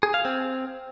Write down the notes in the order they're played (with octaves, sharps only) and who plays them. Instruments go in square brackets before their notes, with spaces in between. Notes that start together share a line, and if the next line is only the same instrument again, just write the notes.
[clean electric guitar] G#4
F5
C4